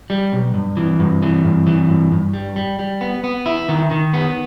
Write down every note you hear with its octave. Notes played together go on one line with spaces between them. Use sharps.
G3
B1
G2
E3
G2
E3
G2
E3
G2
G2
G3
G3
G3
B3
B3
E4
D#3
D#3
B3